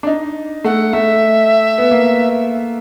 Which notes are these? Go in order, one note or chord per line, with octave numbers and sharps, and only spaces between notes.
D4
D#4
A3 F#5
A3 E5
B3
A#3